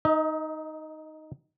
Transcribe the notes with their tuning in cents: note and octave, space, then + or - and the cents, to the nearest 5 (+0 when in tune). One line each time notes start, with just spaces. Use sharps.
D#4 +0 D#5 +35